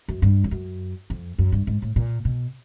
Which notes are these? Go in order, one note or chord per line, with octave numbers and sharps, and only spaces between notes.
F#2
G2
F2
F#2
F2
F#2
G2
G#2
A2
A#2
B2